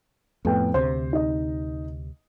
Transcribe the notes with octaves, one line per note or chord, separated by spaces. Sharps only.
F2 A2 B3 G5
D2 C3 C5
D#4 D#5